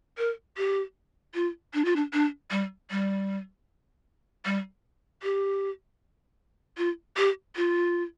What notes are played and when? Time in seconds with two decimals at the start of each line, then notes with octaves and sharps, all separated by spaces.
0.18 A#4
0.57 G4
1.34 F4
1.74 D4
1.85 F4
1.96 D4
2.13 D4
2.51 G3
2.91 G3
4.45 G3
5.23 G4
6.78 F4
7.17 G4
7.56 F4